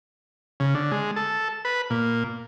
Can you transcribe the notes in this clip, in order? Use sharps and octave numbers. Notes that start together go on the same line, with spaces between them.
C#3
D3
G#3
A4
B4
A#2